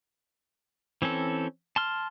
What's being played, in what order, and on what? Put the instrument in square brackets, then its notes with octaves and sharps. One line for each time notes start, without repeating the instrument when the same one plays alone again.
[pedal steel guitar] E3 C4 C#4 A4
A5 C6 F6